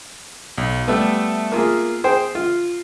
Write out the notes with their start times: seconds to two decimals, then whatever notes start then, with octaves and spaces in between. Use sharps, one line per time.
0.58 B1
0.88 G3 A3 B3 B4 E5
1.52 A#3 F4 G#4
2.04 G#4 C5 G5
2.35 F4